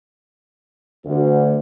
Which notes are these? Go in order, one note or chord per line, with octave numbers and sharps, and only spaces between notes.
D2